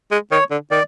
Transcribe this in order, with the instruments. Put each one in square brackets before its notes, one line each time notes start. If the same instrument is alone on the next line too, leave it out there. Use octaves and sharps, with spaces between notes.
[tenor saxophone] G#3
[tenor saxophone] D#3 [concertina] C#5
[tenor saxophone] D3
[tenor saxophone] D#3 [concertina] D5